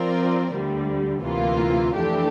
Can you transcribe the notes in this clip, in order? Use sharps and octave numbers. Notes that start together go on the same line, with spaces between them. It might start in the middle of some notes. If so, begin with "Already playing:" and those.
Already playing: F3 C4 F4 A#4 D5
D2 D3 G3
D2 C3 E3 A#3 F4
F2 E3 A3 D4 G4